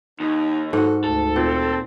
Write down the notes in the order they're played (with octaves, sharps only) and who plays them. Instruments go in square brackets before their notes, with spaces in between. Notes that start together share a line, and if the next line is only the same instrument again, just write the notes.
[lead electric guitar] D#2 [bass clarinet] D#4
[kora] G#2 F#4 [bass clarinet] A4
[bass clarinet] D2 [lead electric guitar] A4
[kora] A#2 [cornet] C4